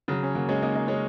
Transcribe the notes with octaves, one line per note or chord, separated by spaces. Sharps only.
C#3 F#3
C#4
F#3 A#3
G#3 C#4
A#3 D#4
A#3 D#4
G#3 C#4